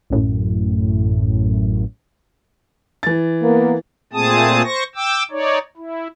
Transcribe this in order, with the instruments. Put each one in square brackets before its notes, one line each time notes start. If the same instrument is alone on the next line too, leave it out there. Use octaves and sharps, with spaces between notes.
[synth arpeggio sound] A1 F#2 A2
[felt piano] E3 A6
[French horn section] A#3 B3
[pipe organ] A#2 A3 C4 G#4 A5 D#6
C5 C#6 A#6
G5 D6 E6
D#4 C#5 D5
E4